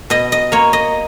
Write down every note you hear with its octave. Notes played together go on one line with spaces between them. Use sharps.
B2 D#5
D#5
A#3 C#5
D#5